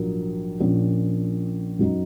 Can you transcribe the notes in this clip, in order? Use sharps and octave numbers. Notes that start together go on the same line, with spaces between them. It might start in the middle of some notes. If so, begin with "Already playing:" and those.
Already playing: A#1 G#2 F#3 A#3
A#1 A#2 A#3 C#4
F#2 F#3 D#4